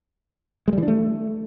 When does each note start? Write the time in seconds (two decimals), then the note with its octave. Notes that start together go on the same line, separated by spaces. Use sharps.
0.68 G#3
0.73 G3
0.78 E3
0.83 D4
0.88 A3